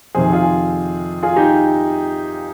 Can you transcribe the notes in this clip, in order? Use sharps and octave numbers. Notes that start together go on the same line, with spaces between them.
F2 C3 D#3 G#4 C5
F4 G#4
F4 G#4
D#4 G4